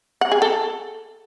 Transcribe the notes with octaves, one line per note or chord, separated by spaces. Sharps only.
F#5
G#4
A4